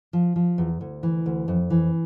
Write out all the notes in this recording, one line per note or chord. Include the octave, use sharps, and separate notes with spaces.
F3
F3
E2
D2
E3
D2
F2
E3